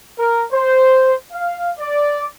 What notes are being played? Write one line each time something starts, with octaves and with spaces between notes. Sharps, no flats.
A#4
C5
F5
D5